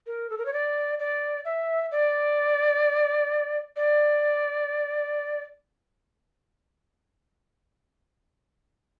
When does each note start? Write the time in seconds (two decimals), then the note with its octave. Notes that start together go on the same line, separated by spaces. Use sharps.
0.07 A#4
0.30 A4
0.38 A#4
0.46 C#5
0.53 D5
0.99 D5
1.45 E5
1.91 D5
3.76 D5